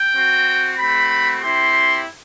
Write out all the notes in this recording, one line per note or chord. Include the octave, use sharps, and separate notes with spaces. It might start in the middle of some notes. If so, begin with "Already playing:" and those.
Already playing: G5
C4 F#4
A3 C4 F#4 B5
C4 E4 G4 C6